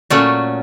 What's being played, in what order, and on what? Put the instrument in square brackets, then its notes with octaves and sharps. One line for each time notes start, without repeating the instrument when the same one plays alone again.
[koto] A#2 F#3 A3 C#4